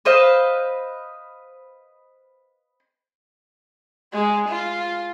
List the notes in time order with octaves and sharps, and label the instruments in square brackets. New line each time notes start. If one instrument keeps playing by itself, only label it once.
[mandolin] B4 C5 D#5 F5
[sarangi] G#3
F4